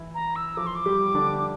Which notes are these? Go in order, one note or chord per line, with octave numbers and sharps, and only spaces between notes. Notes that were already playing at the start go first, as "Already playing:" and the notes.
Already playing: E3 E4
A#5
E6
F3 F4 D6
C6
D6
G3 G4
D3 D4